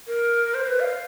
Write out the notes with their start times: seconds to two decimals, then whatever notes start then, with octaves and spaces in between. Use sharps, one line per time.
0.07 A#4
0.54 C5
0.66 B4
0.80 F5